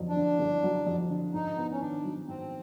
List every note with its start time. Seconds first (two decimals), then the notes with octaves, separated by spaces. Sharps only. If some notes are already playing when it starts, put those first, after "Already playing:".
Already playing: G1 F2 F#3
0.09 D4
0.16 D3
0.39 G1
0.63 F#3
0.86 F2
1.10 D3
1.34 G#2 D#4
1.57 B3
1.72 C#4
1.81 D#3 D4
2.04 F#3
2.28 G#2 C4